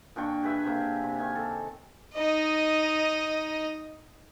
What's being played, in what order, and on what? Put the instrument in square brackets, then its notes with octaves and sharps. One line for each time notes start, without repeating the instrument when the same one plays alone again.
[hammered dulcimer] A#2 D4 G5 C#6
G4 G#4 B4 E5
C3 A#3
C3
D#3 G#5
A4
[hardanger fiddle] D#4 D#5